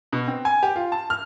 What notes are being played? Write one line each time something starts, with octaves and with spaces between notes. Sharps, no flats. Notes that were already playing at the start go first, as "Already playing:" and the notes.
B2
C4
G#5
G4
F4
A5
F6